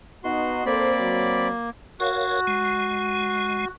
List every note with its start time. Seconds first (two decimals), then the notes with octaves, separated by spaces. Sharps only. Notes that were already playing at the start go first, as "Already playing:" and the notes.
0.24 B3 D#4 F#4 C6
0.66 A#3 C4 A4 C5 D5 B5
0.99 F#3
2.00 F#4 A#4 C#5 F5
2.47 G#3